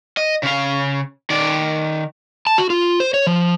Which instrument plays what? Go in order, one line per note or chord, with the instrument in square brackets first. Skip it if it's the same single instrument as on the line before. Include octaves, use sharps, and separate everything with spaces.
[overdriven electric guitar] D#5
C#3 F5
D#3 D5
[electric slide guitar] A5
F#4
F4
C5
C#5
F3